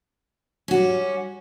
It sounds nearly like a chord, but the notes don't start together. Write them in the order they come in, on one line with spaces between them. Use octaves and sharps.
C#4 F#4 G3